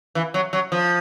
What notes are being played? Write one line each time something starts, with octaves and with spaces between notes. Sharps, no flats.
E3
F#3
F#3
F3